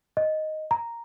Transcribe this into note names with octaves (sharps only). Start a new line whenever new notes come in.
D#5
A#5